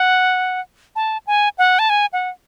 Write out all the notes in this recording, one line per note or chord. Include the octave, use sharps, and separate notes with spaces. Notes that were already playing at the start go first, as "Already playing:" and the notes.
Already playing: F#5
A5
G#5
F#5
A5
G#5
F#5